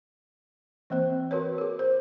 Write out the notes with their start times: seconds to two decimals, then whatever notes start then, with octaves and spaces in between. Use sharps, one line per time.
0.90 E3 A#3 C4 C5
1.31 F#4 A#4 B4 C#5
1.58 G#4 A#4
1.79 C5